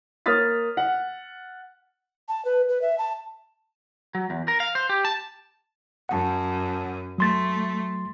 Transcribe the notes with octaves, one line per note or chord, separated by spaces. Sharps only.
A#3 C#5 D#6 F6 A6 B6
F#5
A5
B4
B4
E5
A5
F#3
E2
A#4
F5
C5
G4
A5
F#2 F#5 A5
F#3 A3 C6 A6